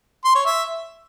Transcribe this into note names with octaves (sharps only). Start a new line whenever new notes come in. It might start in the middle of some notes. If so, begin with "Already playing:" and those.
C6
C#5
E5